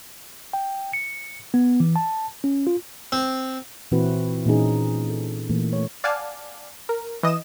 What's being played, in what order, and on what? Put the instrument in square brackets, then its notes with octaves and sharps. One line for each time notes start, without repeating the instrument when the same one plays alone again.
[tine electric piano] G5
C#7
B3
E3
A5
C#4
F4
[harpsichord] C4
[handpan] A#2 E3 C4 E4 F#4 B4
A#2 E3 C#4 D#4 G#4
A4
A#2 E3 A3 A#3
A3 C#5
[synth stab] D5 F5 F#5 G#5 A5
A#4
E3 D#5 D#6 E7